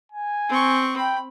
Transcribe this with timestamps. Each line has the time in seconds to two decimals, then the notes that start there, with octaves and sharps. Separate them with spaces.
0.12 G#5
0.49 C4 C#6
0.97 G5 B5